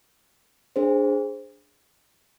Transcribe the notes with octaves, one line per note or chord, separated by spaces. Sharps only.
D4 G#4 C5